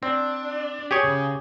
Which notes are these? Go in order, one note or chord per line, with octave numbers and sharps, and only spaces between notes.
C4 D4
G4 G#4 C#5
C#3